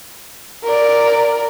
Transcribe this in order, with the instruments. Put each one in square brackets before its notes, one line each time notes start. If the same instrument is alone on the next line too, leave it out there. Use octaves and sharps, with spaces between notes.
[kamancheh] A#4 D5